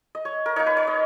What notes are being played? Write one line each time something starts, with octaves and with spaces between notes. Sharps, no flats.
D#5
C#5
A#4
A#3 D#4 C#5
B4
C#5
D#5